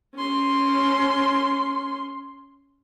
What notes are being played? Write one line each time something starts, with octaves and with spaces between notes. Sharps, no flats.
C#4 C6